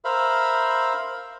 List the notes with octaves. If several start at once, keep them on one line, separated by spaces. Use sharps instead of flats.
A#4 C5 E5 F5 B5